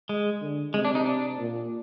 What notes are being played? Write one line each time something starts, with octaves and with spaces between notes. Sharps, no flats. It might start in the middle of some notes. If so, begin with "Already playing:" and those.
G#3
D3
C3 G#3
D4
D#4
D4
A#2